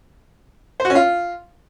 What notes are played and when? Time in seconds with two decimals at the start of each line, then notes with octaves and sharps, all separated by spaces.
0.80 C5
0.85 F#4
0.90 C#4
0.95 F4